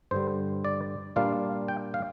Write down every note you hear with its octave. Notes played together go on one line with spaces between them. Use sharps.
G2 D3 G3 C5
D5
A#2 G3 A#3 D4 F4 F5
G5
F5